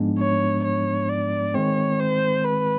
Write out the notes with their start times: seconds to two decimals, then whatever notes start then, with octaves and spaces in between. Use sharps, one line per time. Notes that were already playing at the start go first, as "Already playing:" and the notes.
Already playing: G#2 F3 G#3 B3 D4
0.19 C#5
0.64 C#5
1.09 D5
1.54 D#3 G#3 C4 C#5
1.99 C5
2.44 B4